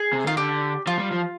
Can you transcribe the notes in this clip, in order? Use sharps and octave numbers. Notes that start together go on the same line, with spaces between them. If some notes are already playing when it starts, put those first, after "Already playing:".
Already playing: G#4
C3
D#3 F4
D3 G4
F3 F4
G3
F3